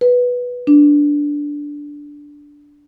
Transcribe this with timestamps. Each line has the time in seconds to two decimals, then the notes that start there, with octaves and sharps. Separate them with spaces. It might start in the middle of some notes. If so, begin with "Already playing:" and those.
0.01 B4
0.67 D4